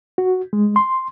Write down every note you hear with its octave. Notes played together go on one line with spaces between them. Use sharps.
F#4
G#3
C6